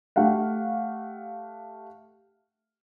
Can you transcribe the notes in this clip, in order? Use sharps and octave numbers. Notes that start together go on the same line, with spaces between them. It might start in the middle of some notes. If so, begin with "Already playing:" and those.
A3 G4 F5 F#5